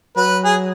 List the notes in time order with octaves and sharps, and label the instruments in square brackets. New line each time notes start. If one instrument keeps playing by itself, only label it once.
[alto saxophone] F#3 [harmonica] B4
[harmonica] G#4